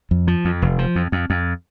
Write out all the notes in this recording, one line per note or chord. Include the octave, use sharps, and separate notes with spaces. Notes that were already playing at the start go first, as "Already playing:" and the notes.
F2
F3
F2
F1
F3
F2
F2
F2